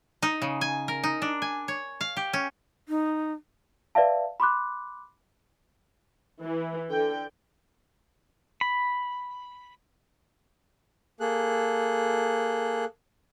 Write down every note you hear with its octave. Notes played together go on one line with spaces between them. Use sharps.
D#4
C#3
G#5
A#4
D#4
D4
G#5
C#5
F5
G4
C#4
D#4
B4 D5 E5 F5 A5
B5 C6 D6 F#6
E3
D3 G5
B5
A#3 G#4 A4 F#6